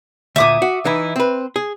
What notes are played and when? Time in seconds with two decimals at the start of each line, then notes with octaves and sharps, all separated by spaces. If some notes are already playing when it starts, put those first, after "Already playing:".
0.36 D2 A#2 E5 D6 D#6
0.62 F#4
0.85 E3 D#4 E4
1.16 C4 B4
1.56 G#4